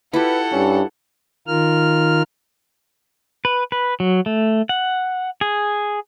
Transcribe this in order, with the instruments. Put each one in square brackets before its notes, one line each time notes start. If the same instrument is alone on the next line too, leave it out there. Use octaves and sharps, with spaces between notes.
[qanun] E4 F4 G4 [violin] A4 F#5 [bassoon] B4
[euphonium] G2 [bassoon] C#4
[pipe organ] D#3 F4 A#4 F6
[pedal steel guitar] B4
B4
F#3
A3
F#5
G#4